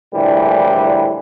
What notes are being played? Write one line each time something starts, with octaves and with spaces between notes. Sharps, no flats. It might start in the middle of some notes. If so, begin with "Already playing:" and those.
A#1 A2 D3 E3 G3